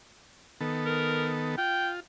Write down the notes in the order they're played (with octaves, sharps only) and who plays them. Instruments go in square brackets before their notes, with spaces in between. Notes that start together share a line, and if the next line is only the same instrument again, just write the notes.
[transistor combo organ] D#3 B3 A4
[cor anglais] A#4
[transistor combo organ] F4 [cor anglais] G5